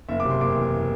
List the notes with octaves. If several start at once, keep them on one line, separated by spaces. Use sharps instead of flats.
F#1 E5
D6
C3
C6
F#1 D6
E2